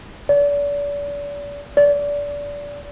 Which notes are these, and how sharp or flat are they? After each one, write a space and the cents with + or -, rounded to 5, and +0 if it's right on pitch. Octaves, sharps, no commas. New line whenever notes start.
D5 -40
D5 -25